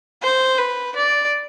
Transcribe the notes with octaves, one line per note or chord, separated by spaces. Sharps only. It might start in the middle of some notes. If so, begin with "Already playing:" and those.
C5
B4
D5